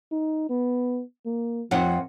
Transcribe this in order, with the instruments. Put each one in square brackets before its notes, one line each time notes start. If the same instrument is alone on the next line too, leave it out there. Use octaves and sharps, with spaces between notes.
[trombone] D#4
B3
A#3
[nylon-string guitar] F2 F#5 [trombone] F3